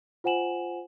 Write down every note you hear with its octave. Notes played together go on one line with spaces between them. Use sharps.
F4 C5 F#5 G#5 E7 F#7